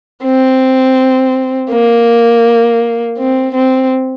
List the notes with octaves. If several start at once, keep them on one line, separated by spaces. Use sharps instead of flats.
C4
A#3
C4
C4